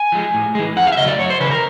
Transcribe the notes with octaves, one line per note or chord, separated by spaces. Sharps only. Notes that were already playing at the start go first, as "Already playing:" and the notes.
Already playing: G#5
F3 G#3
A2
E3 G#3
F2 F#5
F5
E5
C#3 F#3 A3 D#5
D5
F#2 C#5
C5
C#3 E3 B4
A#4